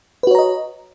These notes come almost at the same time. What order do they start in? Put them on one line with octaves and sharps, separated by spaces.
B4 F#4 C#5 A#5 D#5